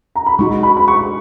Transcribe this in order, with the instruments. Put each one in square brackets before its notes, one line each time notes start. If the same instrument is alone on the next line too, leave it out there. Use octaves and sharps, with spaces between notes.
[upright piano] A#5
B5
[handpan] G#3 D#4 F#4 [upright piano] C#6
[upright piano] B5
B5
C#6